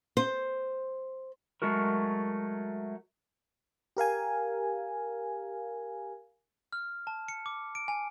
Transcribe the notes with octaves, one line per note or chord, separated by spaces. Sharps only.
C5
F#3 G#3 A3 F#4 A#4
G4 A#4 F5 G#5
F6
A5
C#7
D6
D7
G#5